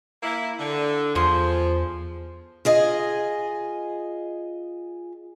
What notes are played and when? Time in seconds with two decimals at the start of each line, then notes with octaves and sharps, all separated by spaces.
0.23 A#3 E4
0.59 D3
1.15 E2 F3 G#4 C6
2.65 F4 G#4 D#5